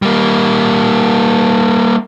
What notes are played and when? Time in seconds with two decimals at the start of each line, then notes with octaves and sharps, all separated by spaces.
0.02 G3 A#3